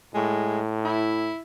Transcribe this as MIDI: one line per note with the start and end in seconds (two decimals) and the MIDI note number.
0.15 1.31 45
0.15 0.60 56
0.85 1.41 64